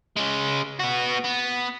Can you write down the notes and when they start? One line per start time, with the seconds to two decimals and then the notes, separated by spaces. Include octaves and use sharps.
0.17 G#3 C#4
0.79 B3 F#4
1.24 B3